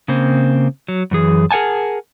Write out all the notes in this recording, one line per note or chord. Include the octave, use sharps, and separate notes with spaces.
C#3 A#3 C4
F#3
F#2 E3 G#4
G#4 A#4 F#5 G#5 A5